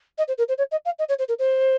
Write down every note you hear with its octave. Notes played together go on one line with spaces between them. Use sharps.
D#5
C5
A#4
C5
C#5
D#5
F5
D#5
C#5
C5
A#4
C5